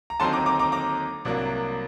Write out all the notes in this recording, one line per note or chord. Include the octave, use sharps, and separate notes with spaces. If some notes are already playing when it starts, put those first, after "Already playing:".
A#5
D#2 D3 F#3 C4 D#4 A5 C6
A#5 D6
A#5 D6
A#5 D6
A#5 D6
C2 C3 F#3 A#3 D4